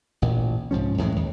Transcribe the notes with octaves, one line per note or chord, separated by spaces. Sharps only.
A1 A#2
C2 G#2 F3 C#4
F2 A2 E3 G#3
D#2